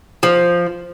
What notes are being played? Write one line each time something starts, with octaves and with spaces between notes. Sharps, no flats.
F3